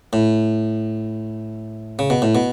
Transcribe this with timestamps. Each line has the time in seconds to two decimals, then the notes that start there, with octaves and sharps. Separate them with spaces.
0.13 A2
1.99 C#3
2.10 B2
2.22 A2
2.35 B2